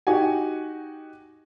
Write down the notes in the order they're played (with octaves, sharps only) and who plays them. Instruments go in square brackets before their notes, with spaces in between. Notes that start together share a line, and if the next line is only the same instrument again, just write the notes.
[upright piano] D#4 F#4 G4 F#5 G#5